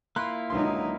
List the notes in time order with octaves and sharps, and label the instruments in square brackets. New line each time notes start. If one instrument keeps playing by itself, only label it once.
[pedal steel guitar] A#3 E4 F4 [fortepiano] B5 C6 F#6
[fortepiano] C#2 D3 C6 [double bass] F#3 D#4